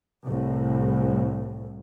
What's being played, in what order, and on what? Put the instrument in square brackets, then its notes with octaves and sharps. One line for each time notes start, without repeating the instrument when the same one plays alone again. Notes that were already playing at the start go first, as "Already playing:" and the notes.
[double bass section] C2 A2